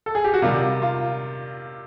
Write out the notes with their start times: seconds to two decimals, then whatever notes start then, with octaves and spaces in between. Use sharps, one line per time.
0.06 A4
0.15 G#4
0.24 G4
0.34 F#4
0.42 C3 D#3 G3 F4
0.82 F4